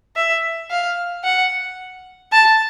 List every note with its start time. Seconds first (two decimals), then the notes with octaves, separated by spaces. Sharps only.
0.16 E5
0.70 F5
1.24 F#5
2.32 A5